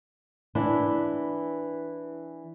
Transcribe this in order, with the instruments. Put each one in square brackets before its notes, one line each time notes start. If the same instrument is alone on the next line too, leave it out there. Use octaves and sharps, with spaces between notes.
[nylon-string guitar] E3 D4 E4